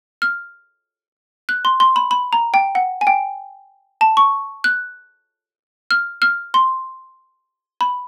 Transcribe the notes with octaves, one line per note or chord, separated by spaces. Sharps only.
F6
F#6
C6
C6
B5
B5
A#5
G5
F#5
G#5
G5
A5
C#6
F#6
F6
F6
C6
B5